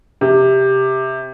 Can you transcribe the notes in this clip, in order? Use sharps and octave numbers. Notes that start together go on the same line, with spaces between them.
C3